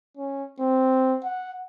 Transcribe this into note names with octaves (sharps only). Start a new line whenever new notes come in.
C#4
C4
F#5